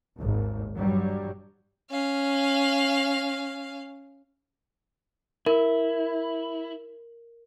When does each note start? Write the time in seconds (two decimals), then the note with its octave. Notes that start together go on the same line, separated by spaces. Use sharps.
0.15 G#1 D#2
0.75 G2 F#3 G3
1.90 C#4 F5
5.46 E4 A#4